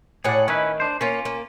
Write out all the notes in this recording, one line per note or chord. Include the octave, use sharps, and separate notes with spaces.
A2 G#4 C#5 D5 F#5
D#3 C#4 E4 B4
D4 C5
A#3 C#4 F4 C#5
A#3